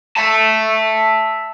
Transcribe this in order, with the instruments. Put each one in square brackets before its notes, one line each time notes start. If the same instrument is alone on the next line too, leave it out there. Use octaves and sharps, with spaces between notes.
[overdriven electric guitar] E5 A5